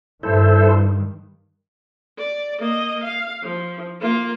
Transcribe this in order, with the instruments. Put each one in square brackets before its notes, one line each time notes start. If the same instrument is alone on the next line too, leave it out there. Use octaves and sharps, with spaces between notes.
[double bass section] G2 D#3 [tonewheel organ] E4 A4 C5
[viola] D5
A#3 D#5
F5
F3
A#3 F4